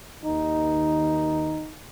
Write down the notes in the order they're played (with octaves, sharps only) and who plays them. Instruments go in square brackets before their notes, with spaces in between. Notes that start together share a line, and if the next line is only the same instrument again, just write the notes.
[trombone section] D#2 D#3 D#4